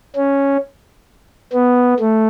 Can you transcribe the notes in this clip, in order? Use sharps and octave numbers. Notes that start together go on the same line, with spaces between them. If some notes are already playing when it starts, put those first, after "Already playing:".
C#4
B3
A3